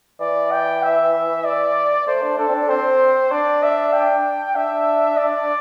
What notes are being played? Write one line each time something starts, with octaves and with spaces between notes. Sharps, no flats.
E3 D5
G5
E5
D5
A3 C5
D4
D4 A4
C4
D4
C4 C5
D4 D5
E5
G5
D4 E5
D5